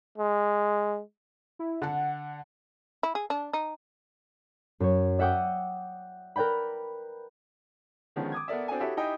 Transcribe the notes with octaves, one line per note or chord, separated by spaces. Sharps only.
G#3
E4
D3 F#5 A5
E4
G#4
D4
D#4
F#2 C#5
D5 E5 F#5 G5 D6 D#6
A#4 B4 D5 G5 B5
D3 D#3 F3 G#3 B3 C#4
D6 D#6 G#6
B3 A4 A#4 D5 E5
C4 D4 F#4 A4 G#5
E4 F#4 G4 A4 C#5 E5
D#4 E4 G4 D#5 G5 G#5